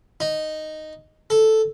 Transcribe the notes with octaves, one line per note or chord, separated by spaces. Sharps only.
D#4
A4